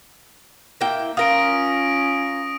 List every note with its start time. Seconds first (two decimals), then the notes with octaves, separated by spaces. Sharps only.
0.81 A#3 E4 G5
1.17 C#4 F4 A#4 D#6 A#6 D7